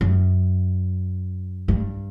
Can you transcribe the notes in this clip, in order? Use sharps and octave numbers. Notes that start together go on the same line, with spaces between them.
F#2
G2